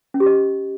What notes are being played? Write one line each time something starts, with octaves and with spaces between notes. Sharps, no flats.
C#4
G4
D#5